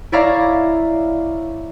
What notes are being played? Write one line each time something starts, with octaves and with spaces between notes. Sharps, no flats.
E4 C#5 D5 E5 F5 A#5